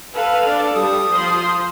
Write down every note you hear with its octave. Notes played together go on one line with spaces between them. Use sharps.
A4 B4 F5
D4 A4 D5
G3 D#6
F3 C5 C6